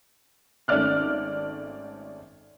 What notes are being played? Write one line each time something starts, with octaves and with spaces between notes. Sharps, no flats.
G#1 A3 C#4 D5 F6 F#6